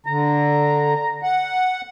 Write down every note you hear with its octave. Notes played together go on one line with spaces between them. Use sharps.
D3 A#5
F#5